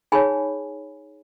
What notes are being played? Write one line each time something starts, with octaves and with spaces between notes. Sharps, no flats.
D#4 G#4 C#5 G#5 B5